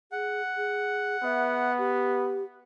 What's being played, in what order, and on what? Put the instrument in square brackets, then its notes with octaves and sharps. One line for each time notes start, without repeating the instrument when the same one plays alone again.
[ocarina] G#4 [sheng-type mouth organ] F#5
[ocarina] G#4
[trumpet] B3 [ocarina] E5
[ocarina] G4